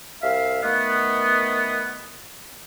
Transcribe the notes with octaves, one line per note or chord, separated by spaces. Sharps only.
C2 E5 F5
D#3 A3 B3